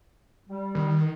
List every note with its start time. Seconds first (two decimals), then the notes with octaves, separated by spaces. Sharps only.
0.49 G3
0.75 D#3